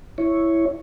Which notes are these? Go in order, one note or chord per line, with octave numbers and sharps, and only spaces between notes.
E4 C#5